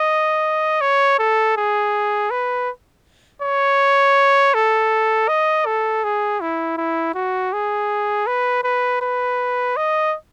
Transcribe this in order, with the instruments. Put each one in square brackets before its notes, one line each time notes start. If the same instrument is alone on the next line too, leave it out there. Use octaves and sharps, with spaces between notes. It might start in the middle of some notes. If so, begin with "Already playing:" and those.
Already playing: [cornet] D#5
C#5
A4
G#4
B4
C#5
A4
D#5
A4
G#4
E4
E4
F#4
G#4
B4
B4
B4
D#5